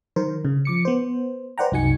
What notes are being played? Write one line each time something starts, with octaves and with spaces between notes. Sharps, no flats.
D#3 F#3 A#4 C5
C#3
F3 D6 C#7
B3 C5
B4 C5 D5 F#5 G5 A#5
C2 F#2 D#4 F#4 G#5 C#7